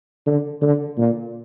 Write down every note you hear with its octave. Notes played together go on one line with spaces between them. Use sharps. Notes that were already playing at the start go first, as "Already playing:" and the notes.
D3
D3
A#2